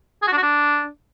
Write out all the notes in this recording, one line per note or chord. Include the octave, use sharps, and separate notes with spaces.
G#4
F#4
D4
F#4
D4